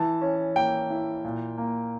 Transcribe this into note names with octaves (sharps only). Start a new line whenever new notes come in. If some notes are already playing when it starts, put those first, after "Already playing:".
Already playing: E3 A5
C#4
A#3 G5
E4
A#2
A#3